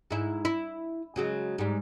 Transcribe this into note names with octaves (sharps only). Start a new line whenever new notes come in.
G#2 E4
E4
C#3 F#3 G#3
G#2 G3